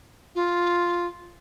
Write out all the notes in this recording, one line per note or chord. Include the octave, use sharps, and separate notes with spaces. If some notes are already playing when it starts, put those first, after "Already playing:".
F4